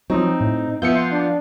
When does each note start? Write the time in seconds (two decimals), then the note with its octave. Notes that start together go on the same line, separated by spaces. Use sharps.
0.10 F3 F#3 C4 D#4
0.40 A2
0.82 F3 B3 F4 E5 G6 C#7
0.95 C6
1.12 D4